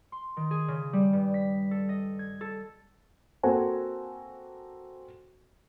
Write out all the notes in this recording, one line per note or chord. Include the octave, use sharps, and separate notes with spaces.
C6
D#3
G#4
C#3
G3
G2
B6
A4
D#5
G#6
A4
A#3 C4 F#4 A4 C5 G#5